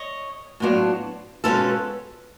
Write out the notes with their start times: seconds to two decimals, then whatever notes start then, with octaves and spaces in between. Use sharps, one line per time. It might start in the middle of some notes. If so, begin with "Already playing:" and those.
Already playing: C#5 D#5
0.60 A2 F#3 B3 D4 F4
1.44 B2 G#3 C#4 F4 A4 B4